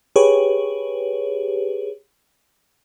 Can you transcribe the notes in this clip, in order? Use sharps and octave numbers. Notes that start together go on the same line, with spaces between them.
G4 G#4 B4 C#5